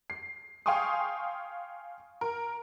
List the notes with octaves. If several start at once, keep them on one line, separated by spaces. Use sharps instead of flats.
C7
F5 G5 G#5 C6 C#6 D#6
A#4